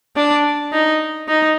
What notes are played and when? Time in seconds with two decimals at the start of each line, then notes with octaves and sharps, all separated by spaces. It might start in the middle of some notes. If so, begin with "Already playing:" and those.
0.16 D4
0.73 D#4
1.28 D#4